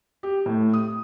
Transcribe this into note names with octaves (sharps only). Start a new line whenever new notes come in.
G4
A2
D#6